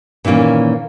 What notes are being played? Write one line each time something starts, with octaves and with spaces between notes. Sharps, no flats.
A#2 D#3 E3 A#3 C#4